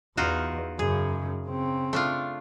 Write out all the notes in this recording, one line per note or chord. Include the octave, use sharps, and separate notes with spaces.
E2 D#4 F4 F#4
F#2 C#3 G#4
C#3 C4
A3 D4 F4